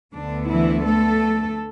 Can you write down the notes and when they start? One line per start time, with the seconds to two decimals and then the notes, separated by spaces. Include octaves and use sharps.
0.14 D2 D3 B3 D4
0.49 E3 E4
0.84 A3 A4